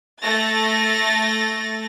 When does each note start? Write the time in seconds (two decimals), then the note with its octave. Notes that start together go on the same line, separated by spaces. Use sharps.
0.21 A3 A6 A#6